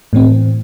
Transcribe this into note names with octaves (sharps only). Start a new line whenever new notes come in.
A2 E3 C4